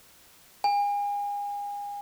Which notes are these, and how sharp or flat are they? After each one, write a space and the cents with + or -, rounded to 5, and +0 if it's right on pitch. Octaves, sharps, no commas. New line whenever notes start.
G#5 -35